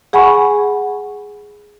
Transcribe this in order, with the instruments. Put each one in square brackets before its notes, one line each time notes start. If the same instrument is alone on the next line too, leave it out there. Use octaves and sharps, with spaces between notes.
[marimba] G#4 F#5 G#5 B5 C#6